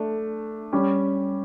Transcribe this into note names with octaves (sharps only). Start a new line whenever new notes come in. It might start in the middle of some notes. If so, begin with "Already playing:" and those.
Already playing: A3 D4
G3 C#4 G4